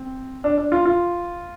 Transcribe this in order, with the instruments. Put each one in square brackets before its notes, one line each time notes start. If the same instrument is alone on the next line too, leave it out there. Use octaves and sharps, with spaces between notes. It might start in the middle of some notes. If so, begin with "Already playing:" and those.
Already playing: [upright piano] C4
D4
D4
F4
F4